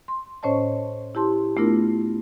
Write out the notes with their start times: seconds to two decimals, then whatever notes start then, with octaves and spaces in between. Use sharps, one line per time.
0.08 C6
0.43 A2 C#4 C5 C#5 D#5 A5
1.15 E4 G4 A5 C6
1.57 A3 B3 D4 E4 F4 A#4